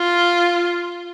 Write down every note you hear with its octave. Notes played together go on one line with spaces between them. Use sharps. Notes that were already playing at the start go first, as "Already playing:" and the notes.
Already playing: F4